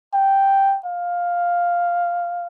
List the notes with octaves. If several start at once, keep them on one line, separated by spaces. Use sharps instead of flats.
G5
F5